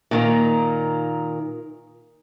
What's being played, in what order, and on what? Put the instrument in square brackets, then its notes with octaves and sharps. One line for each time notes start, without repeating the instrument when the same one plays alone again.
[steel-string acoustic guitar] A#2 D#3 A#3